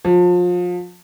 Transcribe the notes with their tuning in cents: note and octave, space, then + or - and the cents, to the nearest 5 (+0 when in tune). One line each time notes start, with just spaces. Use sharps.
F3 +30